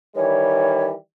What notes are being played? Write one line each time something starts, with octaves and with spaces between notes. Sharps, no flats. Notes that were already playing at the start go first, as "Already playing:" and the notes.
D#3 E3 G3 C#5